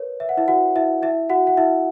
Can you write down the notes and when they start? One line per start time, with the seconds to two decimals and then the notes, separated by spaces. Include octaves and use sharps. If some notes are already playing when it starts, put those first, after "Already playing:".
Already playing: A#4 B4 C#5
0.20 E5
0.29 F#5
0.37 E4 E5
0.48 F#4 F#5
0.75 E4 E5
1.02 E4 E5
1.30 F#4 F#5
1.47 F#5
1.57 E4 E5